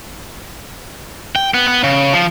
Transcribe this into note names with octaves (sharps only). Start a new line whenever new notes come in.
G5
B3
B3
C#3
F3